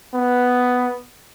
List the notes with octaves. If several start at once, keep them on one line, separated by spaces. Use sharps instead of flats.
B3